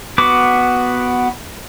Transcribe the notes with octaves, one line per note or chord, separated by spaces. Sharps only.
B3 F#4 D6